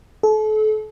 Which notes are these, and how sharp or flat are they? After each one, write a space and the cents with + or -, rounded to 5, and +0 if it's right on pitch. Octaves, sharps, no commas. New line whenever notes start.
A4 -35